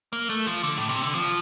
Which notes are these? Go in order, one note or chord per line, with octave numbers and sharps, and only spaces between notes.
A#3
A3
F3
D3
A2
C3
D3
F3